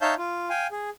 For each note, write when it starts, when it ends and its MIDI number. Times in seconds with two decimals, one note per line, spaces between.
0.01 0.15 63
0.01 0.15 73
0.01 0.15 76
0.01 0.15 77
0.01 0.15 81
0.01 0.15 91
0.18 0.49 65
0.50 0.67 77
0.50 0.67 79
0.50 0.67 80
0.71 0.90 68